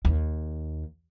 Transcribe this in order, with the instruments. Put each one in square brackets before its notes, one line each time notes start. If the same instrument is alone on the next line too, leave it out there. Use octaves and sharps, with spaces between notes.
[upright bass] D#2